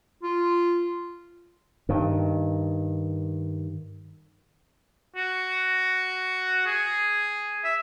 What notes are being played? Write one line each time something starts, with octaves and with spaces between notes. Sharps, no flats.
F4
G2 D#3
F#4
G#4
E5